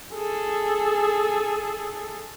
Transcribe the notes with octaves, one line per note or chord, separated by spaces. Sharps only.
G#4 A4